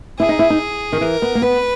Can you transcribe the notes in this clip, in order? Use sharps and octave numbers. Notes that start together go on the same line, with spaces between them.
E4 G#4
D#4
E4
D#4
D#3
E3 A#4
B3
A#3
B3 B4